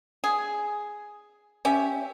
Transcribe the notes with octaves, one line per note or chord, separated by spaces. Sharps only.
G#4
C#4 G4 E5